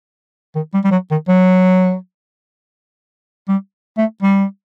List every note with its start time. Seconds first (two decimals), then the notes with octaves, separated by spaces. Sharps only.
0.55 D#3
0.74 G3
0.84 G3
0.91 F#3
1.11 D#3
1.28 F#3
3.49 G3
3.97 A3
4.22 G3